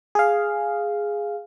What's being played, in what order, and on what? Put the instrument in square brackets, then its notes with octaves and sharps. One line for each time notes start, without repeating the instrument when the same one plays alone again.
[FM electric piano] G#4 F5